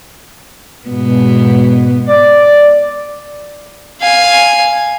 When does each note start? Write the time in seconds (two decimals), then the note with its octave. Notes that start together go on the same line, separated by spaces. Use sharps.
0.88 G#2 B2 B3
2.07 D5
4.02 F5 G#5